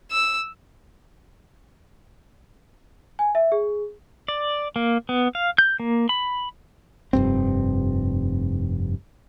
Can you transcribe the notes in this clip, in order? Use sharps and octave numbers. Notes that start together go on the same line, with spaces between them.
E6
G#5
E5
G#4
D5
A#3
B3
F5
G6
A#3
B5
F1 G2 C4